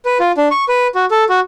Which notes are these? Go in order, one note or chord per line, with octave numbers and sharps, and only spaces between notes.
B4
F4
D4
C#6
B4
F#4
A4
F#4